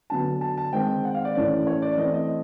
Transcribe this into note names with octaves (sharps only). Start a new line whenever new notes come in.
D3 F#3 B3 A5
A5
A5
D#3 G#3 C4 G5
F#5
F5
D5
A2 E3 A3 C#4 D5
C#5
D5
E3 A3 C4 D#5
D#5